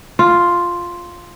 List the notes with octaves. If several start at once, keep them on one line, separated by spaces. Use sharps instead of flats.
F4